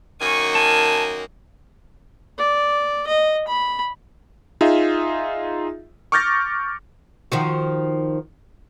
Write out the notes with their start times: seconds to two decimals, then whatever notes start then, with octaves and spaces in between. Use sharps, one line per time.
0.21 F#2 D#3 A#3 G#5 C#6
0.55 G#5 A5
2.38 D5
3.07 D#5
3.48 B5
4.61 D#4 F4 G#4 E5
6.12 C#6 D6 F6 G6 A6 A#6
7.32 D#3 F3 F#4